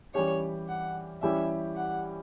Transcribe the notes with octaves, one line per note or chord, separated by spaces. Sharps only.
E3 G3 C#4 G4 C#5
F#5
E3 G3 C#4 E4 G4 E5
F#5